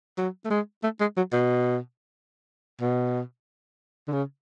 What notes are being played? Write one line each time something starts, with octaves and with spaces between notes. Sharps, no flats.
F#3
A3
G#3
A3
G#3
F#3
B2
B2
D3
C#3